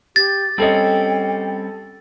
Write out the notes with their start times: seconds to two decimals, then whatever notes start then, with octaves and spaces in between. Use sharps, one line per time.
0.16 G4 A6
0.58 G3 C4 C#4 A4 D#5 G5